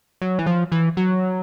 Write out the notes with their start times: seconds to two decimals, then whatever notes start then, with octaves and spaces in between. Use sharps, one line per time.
0.22 F#3
0.39 E3
0.46 F3
0.72 E3
0.97 F#3